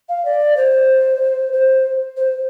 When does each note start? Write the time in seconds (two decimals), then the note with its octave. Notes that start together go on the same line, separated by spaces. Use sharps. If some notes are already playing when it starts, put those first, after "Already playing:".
0.09 F5
0.25 D5
0.57 C5
1.53 C5
2.17 C5